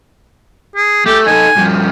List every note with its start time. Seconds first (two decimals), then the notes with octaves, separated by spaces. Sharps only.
0.76 G#4
1.06 A3 G4
1.27 D#4 A4 G#5
1.57 G2 F3